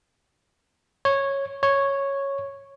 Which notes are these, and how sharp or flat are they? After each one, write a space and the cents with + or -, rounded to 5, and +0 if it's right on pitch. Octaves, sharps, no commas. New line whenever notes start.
C#5 -10
C#5 -5